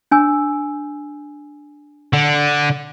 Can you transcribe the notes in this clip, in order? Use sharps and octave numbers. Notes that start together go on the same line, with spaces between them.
D4 G#5 E6
D3